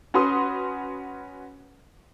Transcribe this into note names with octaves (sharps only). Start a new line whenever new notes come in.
C#4 F#4 B4 C6 D#6